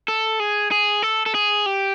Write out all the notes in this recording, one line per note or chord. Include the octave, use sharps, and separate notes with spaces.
A4
G#4
G#4
A4
A4
G#4
G4